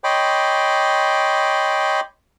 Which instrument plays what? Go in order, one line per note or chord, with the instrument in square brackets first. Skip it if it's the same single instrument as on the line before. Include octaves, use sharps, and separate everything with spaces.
[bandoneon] C#5 D#5 G5 B5 C6 D6